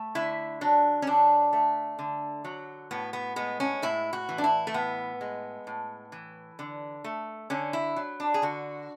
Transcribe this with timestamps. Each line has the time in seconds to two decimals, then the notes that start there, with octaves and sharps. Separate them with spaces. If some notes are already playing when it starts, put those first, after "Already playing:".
Already playing: A3
0.15 D3 E4
0.61 F#3 D4
1.02 C#4
1.07 D3 D4
1.53 A3
1.99 D3
2.45 F#3
2.91 A2 B3
3.13 B3
3.36 G#3 B3
3.60 C#4
3.82 A2 E4
4.13 F#4
4.29 E3
4.38 D4
4.44 E4
4.67 A3
4.74 A2 B3
5.21 G#3
5.67 A2
6.12 E3
6.59 D3
7.04 A3
7.50 D3 C#4
7.73 E4
7.96 F#3
8.20 D4
8.34 G#4
8.42 D3 F#4